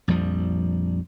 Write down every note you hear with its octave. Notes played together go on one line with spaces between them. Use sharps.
A#1 F2 F3 G3